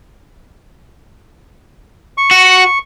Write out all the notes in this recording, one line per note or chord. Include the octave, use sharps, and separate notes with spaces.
C#6
F#4